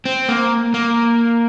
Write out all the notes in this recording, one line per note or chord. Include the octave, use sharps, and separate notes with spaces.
C4
A#3
A#3